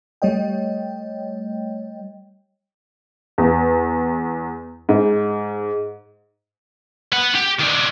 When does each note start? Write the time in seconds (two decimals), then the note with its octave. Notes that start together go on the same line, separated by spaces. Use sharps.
0.22 G3 A3 C#5 D#5 G5
3.38 E2
4.89 G#2
7.12 B3 F#5
7.35 G4
7.60 D#3 D4